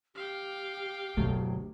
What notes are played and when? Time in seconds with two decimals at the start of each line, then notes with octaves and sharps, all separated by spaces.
0.15 G4 F5 G5
1.17 F#1 D2 B2 F#3 A3